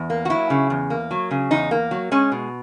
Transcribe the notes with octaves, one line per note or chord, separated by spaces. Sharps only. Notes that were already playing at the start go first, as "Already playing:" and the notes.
Already playing: E2
A#3
F#4
F#3 E4
C#3
E2
A#3
F#3
C#3
E2 D#4
A#3
F#3
G#3 C#4
B2